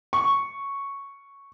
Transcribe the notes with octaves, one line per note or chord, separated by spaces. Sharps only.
C#6